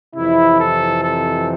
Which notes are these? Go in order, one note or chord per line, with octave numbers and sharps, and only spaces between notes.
F2 C3 E3 E4
A4
A4